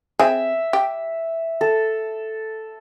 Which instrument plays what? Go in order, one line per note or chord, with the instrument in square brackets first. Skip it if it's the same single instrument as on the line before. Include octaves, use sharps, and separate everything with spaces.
[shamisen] C4 G#4 [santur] E5
[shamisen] G4
[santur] A4